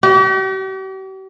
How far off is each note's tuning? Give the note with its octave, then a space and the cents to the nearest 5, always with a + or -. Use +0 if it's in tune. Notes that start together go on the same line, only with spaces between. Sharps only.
G4 -45